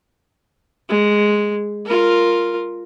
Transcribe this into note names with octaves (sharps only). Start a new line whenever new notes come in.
G#3
F4 A#4